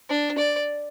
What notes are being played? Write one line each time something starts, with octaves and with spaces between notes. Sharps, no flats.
D4
D5